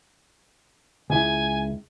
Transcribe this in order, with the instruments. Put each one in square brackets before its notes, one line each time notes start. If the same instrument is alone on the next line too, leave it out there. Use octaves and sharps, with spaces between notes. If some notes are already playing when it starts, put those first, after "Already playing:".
[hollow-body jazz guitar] C#2 E4 [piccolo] G#5